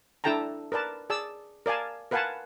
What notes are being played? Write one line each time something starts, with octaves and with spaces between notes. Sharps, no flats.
D4 E4 A4 G5 A5 A#5
A#4 B4 D5 A5
G#4 D5 A5 E6
A#4 D5 F5 G#5 A5
A#4 B4 F5 F#5 G#5 A5